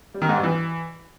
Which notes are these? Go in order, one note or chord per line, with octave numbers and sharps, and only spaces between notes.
G3
D#3
G#2
G2
E3